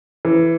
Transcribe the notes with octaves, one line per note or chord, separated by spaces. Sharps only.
E3